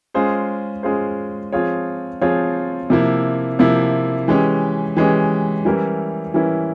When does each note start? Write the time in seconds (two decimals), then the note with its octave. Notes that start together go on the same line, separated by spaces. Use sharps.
0.14 G#3 C#4 F4 G#4 C5
0.83 G#3 C#4 F4 G#4 C5
1.52 F3 C4 F4 G#4 C#5
2.21 F3 C4 F4 G#4 C#5
2.90 C3 F3 A#3 E4
3.59 C3 F3 A#3 E4
4.28 E3 G#3 C#4 G4
4.97 E3 G#3 C#4 G4
5.65 E3 G3 C#4 E4 A#4
6.34 E3 G3 C#4 E4 A#4